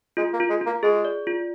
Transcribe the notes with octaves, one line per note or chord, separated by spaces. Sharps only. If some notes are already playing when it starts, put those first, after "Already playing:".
G#3 F4
A#3
F4
G#3
A#3 F4
G#3 G#4
D5
F4